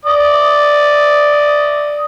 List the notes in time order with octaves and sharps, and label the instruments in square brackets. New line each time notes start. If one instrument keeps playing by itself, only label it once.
[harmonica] D5 D#6